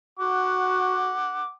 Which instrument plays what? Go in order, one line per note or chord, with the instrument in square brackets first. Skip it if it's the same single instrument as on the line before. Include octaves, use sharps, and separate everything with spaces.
[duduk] F#4 [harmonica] F#5 D6